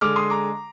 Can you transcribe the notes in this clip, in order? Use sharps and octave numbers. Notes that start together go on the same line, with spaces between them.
D3 G#3 D6 F6
C6 D#6
A#5 D6